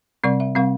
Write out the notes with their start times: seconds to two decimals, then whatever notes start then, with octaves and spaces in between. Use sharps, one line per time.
0.24 C3 G3 C4 D5
0.40 E5
0.55 C3 G3 C4 F5